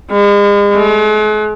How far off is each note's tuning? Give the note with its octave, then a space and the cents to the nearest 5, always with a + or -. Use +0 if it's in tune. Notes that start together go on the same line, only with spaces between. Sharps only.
G#3 -40
G#3 +45